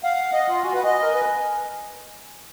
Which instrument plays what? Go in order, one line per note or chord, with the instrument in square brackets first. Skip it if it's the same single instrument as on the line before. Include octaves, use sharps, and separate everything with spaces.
[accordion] F5 [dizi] F#5
[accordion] D#5
F4
[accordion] F#4 [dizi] G#5
[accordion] B4 [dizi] F#5
[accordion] D#5 [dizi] G#5
[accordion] A#4
B4